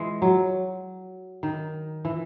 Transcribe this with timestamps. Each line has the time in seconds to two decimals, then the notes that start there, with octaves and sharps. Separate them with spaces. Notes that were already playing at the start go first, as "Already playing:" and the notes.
Already playing: E3 G#3
0.22 F#3
1.43 D#3
2.05 E3